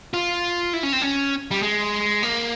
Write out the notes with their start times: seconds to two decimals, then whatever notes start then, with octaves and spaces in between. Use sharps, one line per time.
0.14 F4
0.73 E4
0.83 C#4
0.93 C4
1.02 C#4
1.51 G3
1.63 G#3
2.23 A#3